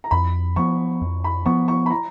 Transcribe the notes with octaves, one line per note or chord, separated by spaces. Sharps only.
A#5
F2 B5
F3 B3 C#6
F2
B5
F3 B3 C#6
C#6
B5
A#5